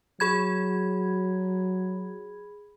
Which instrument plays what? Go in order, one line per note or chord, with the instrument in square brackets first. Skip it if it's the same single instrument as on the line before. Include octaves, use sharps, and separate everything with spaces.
[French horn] F#3 [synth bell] G#4 B5 G#6